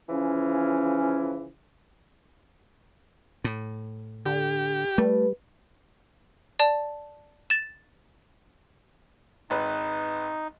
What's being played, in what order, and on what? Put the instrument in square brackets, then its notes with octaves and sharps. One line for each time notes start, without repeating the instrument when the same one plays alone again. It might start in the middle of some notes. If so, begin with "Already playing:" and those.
[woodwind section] C#3 E3 F3 C#4
[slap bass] A2
[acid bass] D3 [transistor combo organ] G4
[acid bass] G3 [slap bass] A3 [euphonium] B4
[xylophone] D5 A5
A6 E7
[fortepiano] G#1 B4 [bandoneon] D#4